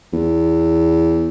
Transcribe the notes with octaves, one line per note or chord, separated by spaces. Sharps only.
E2